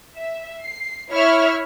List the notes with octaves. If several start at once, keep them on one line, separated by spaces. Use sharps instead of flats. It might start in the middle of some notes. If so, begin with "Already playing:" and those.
E5
C7
E4 C#5 E5 F6